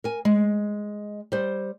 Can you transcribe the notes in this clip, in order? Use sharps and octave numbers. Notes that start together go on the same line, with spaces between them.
A#4 G#5
G#3
G3 C5